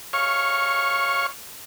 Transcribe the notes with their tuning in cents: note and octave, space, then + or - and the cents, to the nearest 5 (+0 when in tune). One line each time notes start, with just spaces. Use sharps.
C#5 +0 F5 +0 C#6 -20